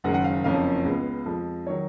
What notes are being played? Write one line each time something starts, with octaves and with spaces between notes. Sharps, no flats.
F#1 F#2 D#3 G#3 F#5
F#5
F5
F#1 F2 F3 A#3 C#4 F5
C#2 C#3 G#3 B3
F2 F3 G#3
D#3 F#3 C#5